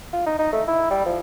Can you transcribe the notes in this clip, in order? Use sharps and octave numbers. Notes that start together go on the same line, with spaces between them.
F4
D#4
D#4
A3
E4
G3
F3